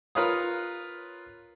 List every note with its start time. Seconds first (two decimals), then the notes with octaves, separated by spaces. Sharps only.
0.15 F4 A#4 B4 C#5 F5 D#6